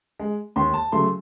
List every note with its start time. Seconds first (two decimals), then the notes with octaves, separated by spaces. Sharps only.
0.20 G#3
0.56 D#2 C6
0.74 A5
0.92 C#3 F#3 A3 C6